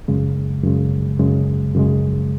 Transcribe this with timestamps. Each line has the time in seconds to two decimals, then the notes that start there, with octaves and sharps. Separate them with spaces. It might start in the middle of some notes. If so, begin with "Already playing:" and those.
0.08 F#2 C#3 G#3
0.64 F#2 C#3 G#3
1.19 F#2 C#3 G#3
1.75 F#2 C#3 G#3